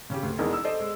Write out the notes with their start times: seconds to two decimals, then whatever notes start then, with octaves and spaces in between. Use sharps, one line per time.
0.10 C#3 C#4 G4
0.23 D2
0.38 E1 E2 D4 D#4 G#4 A#4
0.53 E6
0.64 A4 C5 D5 D#5
0.80 G#3